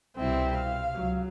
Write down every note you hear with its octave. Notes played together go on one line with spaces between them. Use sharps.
C2 B2 G3 C4 E4
F5
C#2 F#3